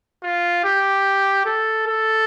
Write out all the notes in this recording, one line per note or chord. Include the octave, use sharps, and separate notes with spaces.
F4
G4
A4
A4